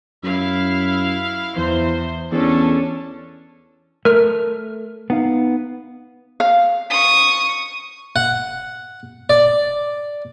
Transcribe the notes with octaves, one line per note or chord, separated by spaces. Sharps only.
F#2 E4 F5
E2 E3 C5
E2 C#4 D4 A4
A3 A#4 F6
B3 D#4 F5
F5
C#6 D#6
F#5
D5